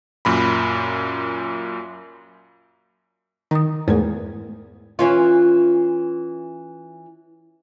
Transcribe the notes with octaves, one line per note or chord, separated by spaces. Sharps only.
F#2 A#2 B5
D#3 A#5 D#6
E2 G#2 A3 A#4
E3 C#4 F4